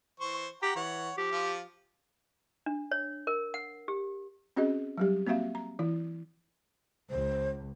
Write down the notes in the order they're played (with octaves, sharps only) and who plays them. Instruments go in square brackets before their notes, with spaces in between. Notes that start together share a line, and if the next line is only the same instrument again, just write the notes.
[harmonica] E3 C5 C#6
[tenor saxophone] G4 [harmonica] F#5 G5 A#5
[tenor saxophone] E3 [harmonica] C#5 F#5
[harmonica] F3 [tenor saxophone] G4
[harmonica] F3 F4
[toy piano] D4
C#5
A#4
F#5
G4
[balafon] C4 C#4 F#4 G#4 D#5
F#3 G3 G4
A#3 C4 F#4 E5 F5
A#5
E3 E4
[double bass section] C#2 [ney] C5